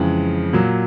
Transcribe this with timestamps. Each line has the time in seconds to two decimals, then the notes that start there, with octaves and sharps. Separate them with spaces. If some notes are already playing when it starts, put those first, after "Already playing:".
Already playing: F2 C#3 E3 G#3
0.53 A#2 F#3